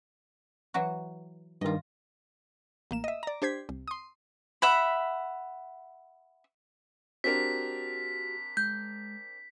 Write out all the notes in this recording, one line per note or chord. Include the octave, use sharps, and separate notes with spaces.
E3 F#3 F#4
G2 D#3 F4 D#5
A1 A#3 E7
D#5 E5
D5 A#5
D4 G4 C5 G#6 B6
C2
C6 D#6
E5 F#5 B5
C4 D4 F#4 G4 A#4 B6
G#3 G6